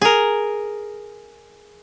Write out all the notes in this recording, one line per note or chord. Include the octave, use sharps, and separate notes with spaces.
G#4 A#4